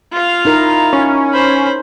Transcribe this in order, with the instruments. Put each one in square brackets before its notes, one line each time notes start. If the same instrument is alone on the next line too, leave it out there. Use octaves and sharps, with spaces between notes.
[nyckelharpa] F4 F5
[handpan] D#4 E4 A#4
[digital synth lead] C#4
[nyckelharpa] C5 B5